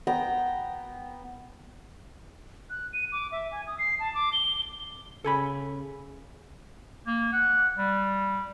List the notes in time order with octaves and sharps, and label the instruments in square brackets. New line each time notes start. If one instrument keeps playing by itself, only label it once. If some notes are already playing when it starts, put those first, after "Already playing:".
[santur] B3 G5 A#5
[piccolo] F#6
D#7
D6
E5
G#5
D#6
C7
A5
D6
G7
[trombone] C#3 [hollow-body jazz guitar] A4 G#5 B5
[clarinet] A#3
F#5
G3